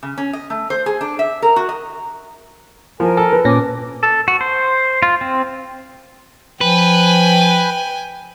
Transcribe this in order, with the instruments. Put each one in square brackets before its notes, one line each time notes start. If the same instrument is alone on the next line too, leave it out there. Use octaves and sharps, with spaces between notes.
[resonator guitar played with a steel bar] C#3
C#4
D#5
A3
C5
G#4
D4
E5
A#4
F#4
D#5
[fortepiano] F3 [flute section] A#4 G#5
[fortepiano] A4
[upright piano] B4
[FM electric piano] A#2 C#4 A#6 [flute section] G#5 D6
[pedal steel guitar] A4
F#4
C5
F4
C4
[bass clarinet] F3 [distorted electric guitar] B4 [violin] G5 G#5